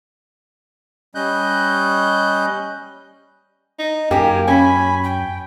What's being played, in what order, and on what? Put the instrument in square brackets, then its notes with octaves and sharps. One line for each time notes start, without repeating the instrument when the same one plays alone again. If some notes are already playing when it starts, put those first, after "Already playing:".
[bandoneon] G3 C#4 D#5 F#6 G6
[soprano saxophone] D#4
[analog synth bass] F#2 [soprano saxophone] A#3 [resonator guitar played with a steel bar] G4 [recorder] G#5
[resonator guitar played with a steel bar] C#4 [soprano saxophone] G#5 [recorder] B5
[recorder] G5